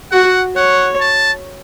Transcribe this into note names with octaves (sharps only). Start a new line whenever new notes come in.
F#4 F#5
C#5 F#5
A5